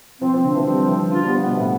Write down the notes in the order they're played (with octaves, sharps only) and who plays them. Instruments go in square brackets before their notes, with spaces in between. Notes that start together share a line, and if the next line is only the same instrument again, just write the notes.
[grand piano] F3 [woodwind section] C4
[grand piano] F3
[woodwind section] C4
[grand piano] D3
[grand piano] E3 [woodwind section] F3
[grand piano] G3 [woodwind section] C4
[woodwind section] F3
[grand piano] E3
[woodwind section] F3
[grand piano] D3 [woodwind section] F4
[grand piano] G3
[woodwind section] B3
[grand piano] F3
[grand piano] B2 [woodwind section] B3
[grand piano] A2 [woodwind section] B3